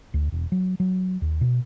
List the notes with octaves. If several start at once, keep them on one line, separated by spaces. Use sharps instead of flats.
D2
E1
F#3
F#3
D#2
B2